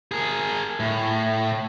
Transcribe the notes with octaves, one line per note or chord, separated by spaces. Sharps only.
G#4 A#4
A2